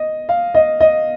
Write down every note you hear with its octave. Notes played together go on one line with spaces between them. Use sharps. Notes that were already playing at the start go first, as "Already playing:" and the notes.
Already playing: D#5
F5
D#5
D#5